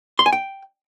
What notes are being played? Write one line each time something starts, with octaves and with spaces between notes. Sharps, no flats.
C6
G#5
G5